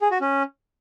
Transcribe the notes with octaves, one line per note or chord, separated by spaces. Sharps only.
G#4
F#4
C#4